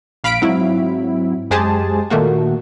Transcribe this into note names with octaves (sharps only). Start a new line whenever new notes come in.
A#1 F5 B5 B6 D7
G#2 F#3 C4 E4
F#2 G#3 G4 G#4 C5 A5
A#2 D#3 A3 A#3 F#4